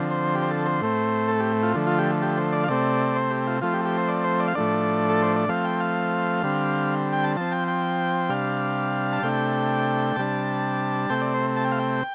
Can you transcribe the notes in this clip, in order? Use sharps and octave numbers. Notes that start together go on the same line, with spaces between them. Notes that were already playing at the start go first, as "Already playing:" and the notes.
Already playing: D3 F3 C4
C5
G4
C5
A4
C5
A2 A3 C4
A4
G4
F4
D3 F3 A3
F4
G4
G4
C5
D5
F5
C3 A3 C4 D5
C5
G4
F4
F3 A3 C4 F4
G4
G4
C5
D5
C5
D5
F5
A2 F3 A3 D4 D5
A4
C5
D5
F3 A3 C4 F5
G5
F5
D3 G3 C4
G5
A5
F3 C4 A5
G5
G5
C3 G3 D4 F5
A5
C3 A3 D4 G5
C3 G3 D4 A5
C3 A3 C4 G5
D5
C5
A5
G5
F5
G5